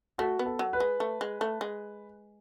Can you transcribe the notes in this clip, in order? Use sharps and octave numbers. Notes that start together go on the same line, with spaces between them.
A3 F#4
B3
A4
F#3
B4
G#3
A3
G#3
A3
G#3